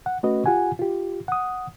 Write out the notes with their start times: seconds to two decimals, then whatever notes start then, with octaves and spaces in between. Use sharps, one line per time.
0.06 F#5
0.23 A3 C#4 F#4 B4 D#5
0.46 F4 G4 F#5 G#5
0.79 F4 G4
1.28 F#5 D#6